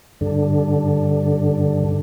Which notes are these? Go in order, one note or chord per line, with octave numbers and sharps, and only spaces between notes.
G2 D3